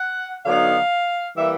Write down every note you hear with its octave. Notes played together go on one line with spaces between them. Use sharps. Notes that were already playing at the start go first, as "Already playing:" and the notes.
Already playing: F#5
D3 F#3 B3 D#4 F5
E3 G3 A#3 E5